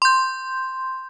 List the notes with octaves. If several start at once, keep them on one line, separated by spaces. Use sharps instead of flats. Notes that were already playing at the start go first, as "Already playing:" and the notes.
C6 G6